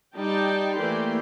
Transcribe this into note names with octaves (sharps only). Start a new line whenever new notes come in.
G3 D#4 D5 G5 A5
E3 A3 A#3 G4 D5 C6